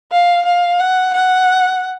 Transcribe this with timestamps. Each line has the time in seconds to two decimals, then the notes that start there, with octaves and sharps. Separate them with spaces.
0.12 F5
0.45 F5
0.79 F#5
1.14 F#5